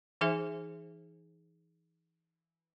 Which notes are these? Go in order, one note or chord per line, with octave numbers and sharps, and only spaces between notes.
E3 D#4 G#4 C5 E5 G#5